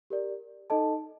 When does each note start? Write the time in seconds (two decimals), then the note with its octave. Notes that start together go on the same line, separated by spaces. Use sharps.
0.10 G4 A#4 D5
0.70 D#4 A4 D#5 A5